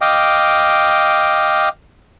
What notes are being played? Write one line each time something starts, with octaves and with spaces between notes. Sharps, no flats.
D#5 F5 G5 D6